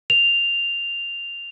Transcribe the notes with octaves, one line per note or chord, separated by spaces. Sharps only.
F7